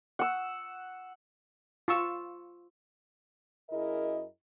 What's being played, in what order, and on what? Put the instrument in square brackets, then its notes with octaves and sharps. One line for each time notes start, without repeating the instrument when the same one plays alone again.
[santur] F#5 E6
[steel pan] F4 C#6 E6
[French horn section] F#2 E4 G#4 A#4 D#5